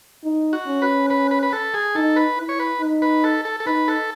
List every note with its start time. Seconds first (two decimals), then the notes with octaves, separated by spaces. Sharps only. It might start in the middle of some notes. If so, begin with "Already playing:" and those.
0.24 D#4
0.53 F#4
0.67 C#4
0.82 B4
1.10 B4
1.31 B4
1.43 B4
1.53 A4
1.74 G#4
1.95 D#4 A4
2.16 B4
2.38 E4
2.49 C#5
2.60 B4
2.81 D#4
3.02 B4
3.24 A4
3.45 A4
3.60 A4
3.66 D#4 B4
3.88 A4